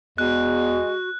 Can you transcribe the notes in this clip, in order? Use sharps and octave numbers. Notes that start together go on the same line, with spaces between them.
E2 G#3 F#4 F#6